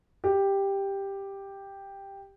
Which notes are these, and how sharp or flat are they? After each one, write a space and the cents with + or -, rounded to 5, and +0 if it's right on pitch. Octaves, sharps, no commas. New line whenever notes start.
G4 +5